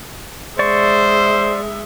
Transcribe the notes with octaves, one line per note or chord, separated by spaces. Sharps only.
G#3 C5 D5 E5 C#6